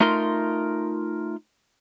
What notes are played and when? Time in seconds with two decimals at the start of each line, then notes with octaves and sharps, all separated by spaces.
0.01 A3 D#4 F4 A#4 C6